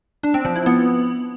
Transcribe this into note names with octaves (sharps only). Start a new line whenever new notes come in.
D4
C4
F3
E4
B3